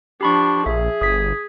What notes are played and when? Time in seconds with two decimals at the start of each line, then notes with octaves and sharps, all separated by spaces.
0.21 F3 D4 G4 B5 C#6
0.66 A#1 G#4 E5
1.01 G1 D#6 G#6 B6